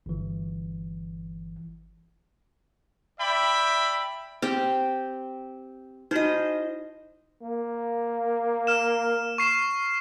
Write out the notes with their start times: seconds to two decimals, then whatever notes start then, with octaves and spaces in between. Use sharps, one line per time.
0.06 G1 E3
3.20 D5 E5 G5 B5
4.42 C4 G4 G5
6.11 D#4 E4 F#4 C5 D#5
7.43 A#3
8.67 F6 E7
9.38 C#6 C7 E7